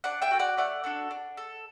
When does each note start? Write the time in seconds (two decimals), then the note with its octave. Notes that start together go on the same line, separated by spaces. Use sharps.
0.04 D4 D5 F#5
0.22 E5 G5
0.31 F#4 A4
0.39 D5 F#5
0.57 A3 D5 F#5
0.84 D4 F#4 A4
1.11 D4
1.37 A4